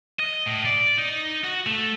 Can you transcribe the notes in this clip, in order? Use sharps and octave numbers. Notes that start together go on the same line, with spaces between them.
D#5
A2
D5
D#4
F#4
A3